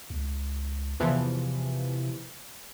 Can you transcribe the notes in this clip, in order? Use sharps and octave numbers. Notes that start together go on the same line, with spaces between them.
C#2
E2 C3 E3 F3